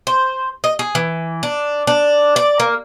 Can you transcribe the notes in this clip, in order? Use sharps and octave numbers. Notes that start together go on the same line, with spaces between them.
C5
D#5
G#4
E3
D4
D4
D5
A#3